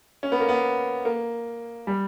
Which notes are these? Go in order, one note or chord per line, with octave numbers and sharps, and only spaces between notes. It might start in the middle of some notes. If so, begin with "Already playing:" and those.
C#4
B3
A#3
B3
A#3
G3